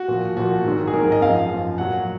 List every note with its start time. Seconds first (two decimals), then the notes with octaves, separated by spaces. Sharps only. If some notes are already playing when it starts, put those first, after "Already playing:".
Already playing: F#4
0.08 A#2 F3
0.37 A#2 F3 F#4
0.64 G#2 D#3 F#3
0.87 G#4
0.93 G#2 D#3 F#3 A#4
1.12 D#5
1.21 F#2 F3 F5
1.50 F#2 F3
1.78 A#2 F#3 F#5